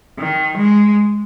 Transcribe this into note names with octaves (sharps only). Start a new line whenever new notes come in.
D#3
G#3